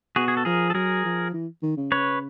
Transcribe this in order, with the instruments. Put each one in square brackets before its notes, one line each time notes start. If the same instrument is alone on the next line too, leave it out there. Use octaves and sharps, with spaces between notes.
[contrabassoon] B2 [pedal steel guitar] F#4 G#4
[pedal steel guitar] G#4
A4
[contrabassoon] F3 [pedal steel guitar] G#4 A#4
[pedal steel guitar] A4
[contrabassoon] F#3 [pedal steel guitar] G#4 A#4
[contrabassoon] F3
E3
D#3
C#3
[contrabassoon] C#3 [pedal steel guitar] B4 C#5